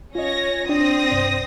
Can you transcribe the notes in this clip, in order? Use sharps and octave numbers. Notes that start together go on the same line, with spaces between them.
C#4 F4 C#5 D#5 A#6
C4 D4 D5 G5 D#6 A#6
C2 G2 D5